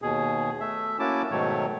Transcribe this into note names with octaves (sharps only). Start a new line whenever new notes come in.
D#2 B2 G#4
A3 E5
A#3 C#4 E4 F#4 A5 D6
G#2 B2 D#3 F#3 A3 C#5